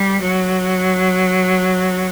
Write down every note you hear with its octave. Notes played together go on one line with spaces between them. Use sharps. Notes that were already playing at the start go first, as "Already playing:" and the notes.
Already playing: G3
F#3